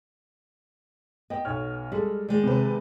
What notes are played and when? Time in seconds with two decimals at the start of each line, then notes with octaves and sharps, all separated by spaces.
1.30 B3 D#5 G5
1.45 B1 C#5 F6
1.92 G3 G#3 A4
2.29 D#3 G#3 A#3 D5
2.43 C3 B4